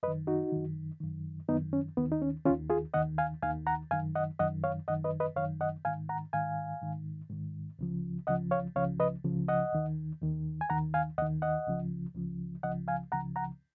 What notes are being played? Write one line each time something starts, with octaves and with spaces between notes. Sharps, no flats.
F#2 D#3 B4 D#5
D#4 F#4
F#2 D#3
F#2 D#3
F#2 D#3 B3 D#4
C#4
D#2 D#3 B3
D#4
C#4
D#2 D#3 C#4 F4
F4 G#4
D#2 D#3 D#5 F#5
F5 G#5
D#2 D#3 F5 G#5
F#5 A#5
F#2 D#3 F5 G#5
D#5 F#5
F#2 D#3 D#5 F#5
C#5 F5
F#2 D#3 D#5 F#5
B4 D#5
B4 D#5
F#2 D#3 C#5 F5
D#5 F#5
G#2 D#3 F5 G#5
F#5 A#5
G#2 D#3 F5 G#5
G#2 D#3
G#2 D#3
C#2 C#3 F3
C#2 C#3 F3 D#5 F#5
C#5 F5
C#2 C#3 F3 C#5 F5
B4 D#5
C#2 C#3 F3
D#5 F#5
D#2 D#3
D#2 D#3
G#5
D#2 D#3 F#5 A#5
F5 G#5
D#2 D#3 D#5 F#5
D#5 F#5
C#2 C#3 F3
C#2 C#3 F3
C#2 C#3 F3 D#5 F#5
F5 G#5
C#2 C#3 F3 F#5 A#5
F#5 A#5